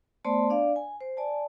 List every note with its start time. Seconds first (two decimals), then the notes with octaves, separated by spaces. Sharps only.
0.24 A3 B3 C5 D5 A5 C6
0.50 D4 D5 F5
0.76 G#5
1.01 C5
1.17 D5 G#5 A5